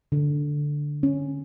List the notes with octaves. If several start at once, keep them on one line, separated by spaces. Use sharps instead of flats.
D3
C#4